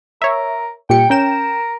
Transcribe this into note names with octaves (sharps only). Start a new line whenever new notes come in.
A#4 C#5 E5
A#2 G3 G5 C#7
C#4 A#4 G5 E7